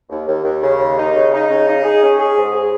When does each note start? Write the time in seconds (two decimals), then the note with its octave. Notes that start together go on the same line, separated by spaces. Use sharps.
0.09 D#2
0.27 D#2
0.44 D#2
0.61 C#3
0.79 D#2
0.97 D#4
1.14 C#3
1.32 D#4
1.49 C#3
1.67 D#4
1.83 G#4
2.01 C#4
2.19 G#4
2.36 G#2
2.53 G#4